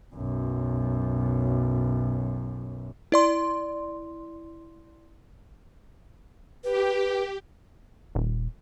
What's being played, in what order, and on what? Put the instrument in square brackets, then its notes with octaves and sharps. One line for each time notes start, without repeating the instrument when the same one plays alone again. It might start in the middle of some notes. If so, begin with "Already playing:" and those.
[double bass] B1 F#2
[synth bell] E4 D5 C6
[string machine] G4 [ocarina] B4
[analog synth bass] D#1